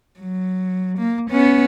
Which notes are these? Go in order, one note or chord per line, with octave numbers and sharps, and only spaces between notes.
F#3
A#3
B3 C#4